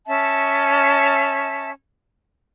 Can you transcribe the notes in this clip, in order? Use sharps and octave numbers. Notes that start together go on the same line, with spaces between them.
C#4 E5 A5